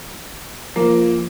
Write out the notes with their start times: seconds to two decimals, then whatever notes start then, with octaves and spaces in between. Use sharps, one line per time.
0.76 F3 A#3